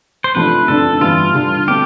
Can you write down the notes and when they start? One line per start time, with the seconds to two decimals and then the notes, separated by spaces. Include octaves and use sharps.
0.24 C5
0.35 C3 F3 A3 D4 B4
0.68 F2 D3 A3 D4 A4
1.01 G2 E3 G3 B3 E4 F4
1.34 D3 G3 D4
1.67 B2 A3 C4 G4